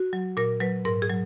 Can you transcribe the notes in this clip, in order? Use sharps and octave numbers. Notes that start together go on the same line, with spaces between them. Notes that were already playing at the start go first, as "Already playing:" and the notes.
Already playing: F#4
F#3
A#2 A#4
F#3 B4
G#2 A#4
G#4
F#3